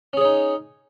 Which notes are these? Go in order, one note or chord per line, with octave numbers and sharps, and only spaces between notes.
C#4 D#4 G#4 C#5